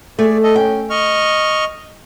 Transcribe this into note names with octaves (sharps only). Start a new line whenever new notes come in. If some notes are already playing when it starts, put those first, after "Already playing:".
A3 G#4 D5
A4 D#5
C#4 G5
D#5 C#6 F6